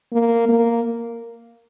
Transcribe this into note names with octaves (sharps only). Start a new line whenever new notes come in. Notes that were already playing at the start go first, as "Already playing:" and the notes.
A#3
A#3